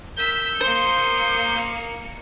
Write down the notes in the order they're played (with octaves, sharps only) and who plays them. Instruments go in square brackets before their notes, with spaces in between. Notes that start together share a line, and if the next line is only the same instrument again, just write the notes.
[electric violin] A#4 [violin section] E6 B6 [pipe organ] G6
[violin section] A#3 C#7 [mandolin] C5 [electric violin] D#6 C7